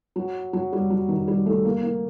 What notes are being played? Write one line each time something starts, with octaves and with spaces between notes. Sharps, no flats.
F#3
F#3
G3
F#3
D#3
G3
A3
A#3
A#3